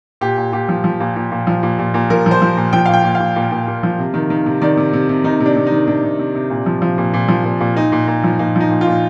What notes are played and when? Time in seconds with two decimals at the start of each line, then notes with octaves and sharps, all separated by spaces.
0.21 A#2 G4
0.37 A#2
0.53 A#2 G4
0.69 F3
0.84 F3
1.00 A#2
1.16 A#2
1.32 A#2
1.47 F3
1.63 A#2
1.79 A#2
1.94 A#2
2.10 F3 A#4
2.26 F3
2.31 C5
2.42 F3
2.57 A#2
2.73 F3 G5
2.86 F5
2.89 A#2 G5
3.04 A#2
3.15 F5
3.20 A#2
3.36 A#2
3.51 A#2
3.67 A#2
3.83 F3
3.99 C3
4.14 D#3
4.30 D#3
4.46 C3
4.62 D#3 D5
4.77 C3
4.93 C3
5.09 C3
5.24 D#3 D#4
5.40 C3
5.46 D4
5.56 C3
5.66 D#4
5.72 D#3
5.88 C3 D4
6.03 C3
6.19 C3
6.35 C3
6.50 A#2
6.66 F3
6.82 F3
6.98 A#2
7.14 A#2
7.28 F3
7.45 A#2
7.60 A#2
7.76 A#2 D#4
7.92 A#2
8.08 A#2
8.24 F3
8.39 A#2 D#4
8.55 F3 D#4
8.71 A#2
8.81 F4
8.87 A#2